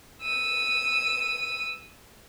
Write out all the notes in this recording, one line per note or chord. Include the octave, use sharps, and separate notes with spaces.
E6 D#7